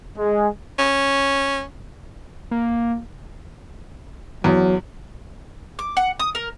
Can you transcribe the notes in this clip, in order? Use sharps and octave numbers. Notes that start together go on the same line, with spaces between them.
G#3
C#4
A#3
E2 F#3
D6
F#5
D#6
A#4